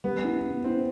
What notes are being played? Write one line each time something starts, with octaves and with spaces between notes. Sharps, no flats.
G3 B3
E4
B3
C4 E4